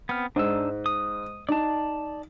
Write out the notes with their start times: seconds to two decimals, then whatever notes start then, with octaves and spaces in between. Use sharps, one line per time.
0.09 B3 C4 F6
0.36 G#2 D4 D#4 E6
0.86 D#6
1.49 D#4 D5 A5